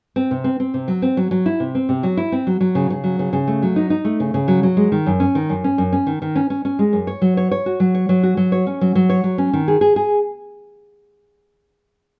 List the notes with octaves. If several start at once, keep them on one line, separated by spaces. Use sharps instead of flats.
C4
C3
C4
C4
C3
F#3
C4
F#3
F#3
E4
C3
C4
C3
F#3
E4
C4
F#3
F#3
C#3
C#3
F#3
C#3
C#3
A3
F#3
D#4
D#4
A3
C#3
C#3
F#3
F#3
G#3
D#3
F#2
C#4
D#3
F#2
C#4
F#2
C#4
D#3
D#3
C#4
C#4
C#4
G#3
F#2
C#5
F#3
C#5
C#5
F#4
F#3
C#5
F#3
F#4
F#3
C#5
C#4
F#3
F#3
C#5
F#3
C#4
D#3
G#4
G#4
G#4